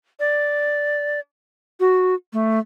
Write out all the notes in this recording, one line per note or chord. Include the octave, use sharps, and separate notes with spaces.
D5
F#4
A3